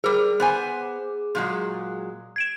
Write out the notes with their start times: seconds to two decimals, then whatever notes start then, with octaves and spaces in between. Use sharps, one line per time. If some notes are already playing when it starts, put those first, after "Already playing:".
0.04 G3 G#4 A#4 D6
0.40 B3 C5 G#5
1.35 A#2 F#3 G#3
2.36 G#6 D7 E7